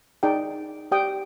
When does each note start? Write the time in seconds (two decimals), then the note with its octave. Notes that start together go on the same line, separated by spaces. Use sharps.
0.23 D#4 G#4 D5 G5
0.92 G4 D5 G5 D#6